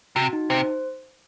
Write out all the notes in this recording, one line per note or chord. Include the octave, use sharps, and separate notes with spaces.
C3 F#4
D#4
C3 C5